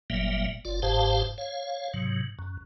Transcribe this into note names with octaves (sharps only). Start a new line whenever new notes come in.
G1 A#2 F#3 G3 A#3 E5
F#1 F4 D5
G1 G#2 G4 C5 F5 A5
C#5 F5
G#2 C3 F#3
F#2